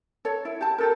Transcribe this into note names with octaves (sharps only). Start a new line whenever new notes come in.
A4 C#5
E4
G4 A5
G4 A4 A#4